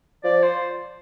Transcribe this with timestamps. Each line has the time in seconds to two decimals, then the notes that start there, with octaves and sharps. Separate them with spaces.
0.24 F3 D5
0.43 C5